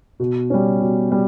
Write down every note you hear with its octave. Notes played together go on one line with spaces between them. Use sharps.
B2
G3 C#4
B2
G3